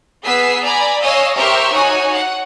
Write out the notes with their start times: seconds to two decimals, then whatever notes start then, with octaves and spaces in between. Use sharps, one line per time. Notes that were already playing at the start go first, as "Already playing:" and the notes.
0.24 B3 G#4 E6 B6 C7
0.63 D5 G#5 A#5 B5
1.02 C#5 D#5 F5 G#5 E6 A#6
1.36 G4 A#4 C5 E5 C#6 F6
1.72 D#4 F#4 C#5 G#5
2.14 F#5